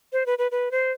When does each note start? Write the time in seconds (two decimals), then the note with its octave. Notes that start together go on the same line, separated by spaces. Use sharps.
0.13 C5
0.26 B4
0.38 B4
0.51 B4
0.71 C5